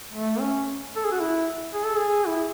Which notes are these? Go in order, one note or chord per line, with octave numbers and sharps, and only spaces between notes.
A3
C#4
A4
G#4
F#4
E4
G#4
A4
G#4
E4